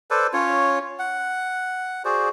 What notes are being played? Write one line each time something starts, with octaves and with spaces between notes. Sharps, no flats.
A4 B4 C5 D5
C#4 F4 C#5
F#5
F#4 G#4 C5 D5